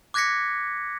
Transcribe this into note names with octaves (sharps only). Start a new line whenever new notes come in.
D6 F#6 G#6 A#6 B6 C#7